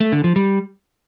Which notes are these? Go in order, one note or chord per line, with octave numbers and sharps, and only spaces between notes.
A3
D3
F3
G3